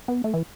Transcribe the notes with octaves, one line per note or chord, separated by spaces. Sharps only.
B3
A3
E3